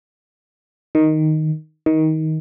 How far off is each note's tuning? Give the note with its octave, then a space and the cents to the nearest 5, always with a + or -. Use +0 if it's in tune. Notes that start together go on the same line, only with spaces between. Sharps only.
D#3 +0
D#3 +20